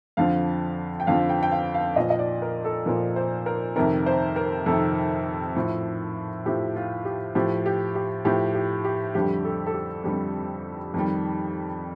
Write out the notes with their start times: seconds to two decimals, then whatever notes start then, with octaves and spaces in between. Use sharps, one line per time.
0.17 F2 D3 F3 F5
1.00 G5
1.07 F2 D3 F3 F5
1.29 G5
1.43 G5
1.51 F5
1.74 F5
1.96 A#2 F3 D#5
2.10 D#5
2.19 D5
2.42 A#4
2.65 A4
2.86 A#2 F3 A#4
3.16 C5
3.46 A#4
3.76 F2 C3 D#3 A#4
4.06 C5
4.36 A#4
4.66 F2 C3 D#3 A4
5.56 A2 F3
6.46 A2 F3 G4
6.76 F4
7.05 G4
7.35 A2 F3 G4
7.66 G4
7.95 G4
8.25 A2 F3 G4
8.55 G4
8.84 G4
9.14 F2 D3 G3 G4
9.44 A4
9.66 A4
9.74 G4
10.04 F2 D3 G3 G4
10.94 F2 D#3 G3